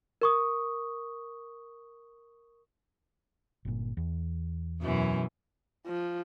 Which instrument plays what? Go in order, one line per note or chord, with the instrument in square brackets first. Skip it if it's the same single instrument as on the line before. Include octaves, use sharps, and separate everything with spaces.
[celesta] A#4 C#6 D#6
[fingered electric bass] G1 A#2
E2
[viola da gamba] F#2 B2 E3
[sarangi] F3